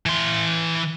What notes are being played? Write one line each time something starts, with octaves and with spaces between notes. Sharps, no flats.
E3 C6